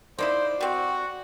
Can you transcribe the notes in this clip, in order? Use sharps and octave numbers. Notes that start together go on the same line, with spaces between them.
A#3 D#4 E4 C5 D5
G3 C4 F#4